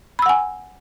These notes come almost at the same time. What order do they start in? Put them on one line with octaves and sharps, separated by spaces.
B5 E6 F#5 G#5